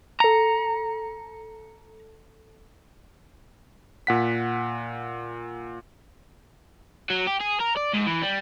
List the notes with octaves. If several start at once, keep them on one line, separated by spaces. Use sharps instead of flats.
A4 A#5 C#7
A#2 F#5 B6
F#3
G4
G#4
A#4
D5
G#2
E3
G3